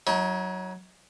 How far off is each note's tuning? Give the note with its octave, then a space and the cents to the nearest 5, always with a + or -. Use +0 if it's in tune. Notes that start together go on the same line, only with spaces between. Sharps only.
F#3 +0 D#4 +45